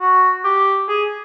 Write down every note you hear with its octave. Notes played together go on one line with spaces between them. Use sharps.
F#4
G4
G#4